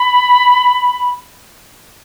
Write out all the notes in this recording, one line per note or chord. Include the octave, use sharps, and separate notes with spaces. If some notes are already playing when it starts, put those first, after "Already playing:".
Already playing: B5